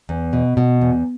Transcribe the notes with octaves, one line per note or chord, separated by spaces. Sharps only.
E2
B2
B2
E2